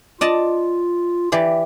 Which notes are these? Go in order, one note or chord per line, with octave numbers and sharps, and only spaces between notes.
F4 D5 D#5 A5
E3 G4 D5